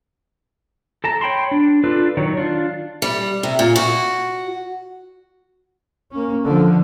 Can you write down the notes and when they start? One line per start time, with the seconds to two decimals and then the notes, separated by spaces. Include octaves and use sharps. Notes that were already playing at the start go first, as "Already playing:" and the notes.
1.04 A4 A5 A#5
1.21 C#5 G5 B5 C6
1.51 D4
1.84 D4 F4 A4 B4 D5
2.17 D#3 F#3 C#5
2.37 D4 F4
3.02 G3
3.43 C3
3.59 A#2
3.76 F#4
6.11 A#3 C#4
6.44 D3 F3